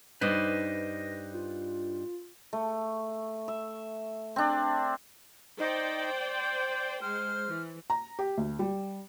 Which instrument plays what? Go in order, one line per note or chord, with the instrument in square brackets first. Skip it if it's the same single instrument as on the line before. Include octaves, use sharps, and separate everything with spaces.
[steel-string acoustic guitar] G2 D4 D#4 [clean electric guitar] B4 C5 D#5 [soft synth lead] A#6
[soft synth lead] F4
[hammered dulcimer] A3
E5
C4 D4
[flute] D#4 [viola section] C5 D5 G5
[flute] G6
[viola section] G#3 C5 [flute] F6
[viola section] E3
[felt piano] A#5
G4
D2
G3